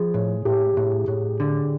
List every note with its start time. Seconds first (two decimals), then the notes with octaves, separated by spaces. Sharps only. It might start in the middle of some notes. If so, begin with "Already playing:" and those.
Already playing: F3 G#4
0.14 A2
0.45 A2 G4
0.77 A2
1.08 A2
1.40 D3